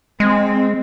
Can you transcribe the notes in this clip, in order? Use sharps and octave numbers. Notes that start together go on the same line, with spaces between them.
G#3 C4